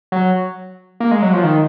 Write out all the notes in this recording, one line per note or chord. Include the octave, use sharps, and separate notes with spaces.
F#3
A#3
G#3
F#3
F3
D#3